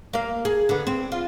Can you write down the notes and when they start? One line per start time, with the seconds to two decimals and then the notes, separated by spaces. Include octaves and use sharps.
0.13 A#3 F5
0.45 G#4
0.69 D3 B3
0.87 C4
1.12 F4